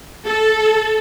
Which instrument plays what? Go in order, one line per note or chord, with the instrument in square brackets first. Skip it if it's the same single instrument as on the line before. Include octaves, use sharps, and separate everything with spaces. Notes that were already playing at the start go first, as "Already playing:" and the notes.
[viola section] A4